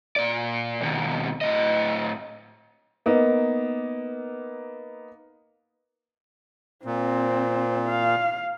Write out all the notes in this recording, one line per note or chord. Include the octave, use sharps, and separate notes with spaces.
A#2 D5
D#2 B2
A2 D#5
A#3 B3 D#4
A#2 C4
F5